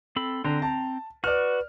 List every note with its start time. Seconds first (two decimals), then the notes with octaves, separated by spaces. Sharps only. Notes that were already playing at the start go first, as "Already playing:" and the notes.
0.16 C4 A4 B5
0.44 D3 C4 G5 A#5
0.62 A5
1.24 F#4 B4 D5 F6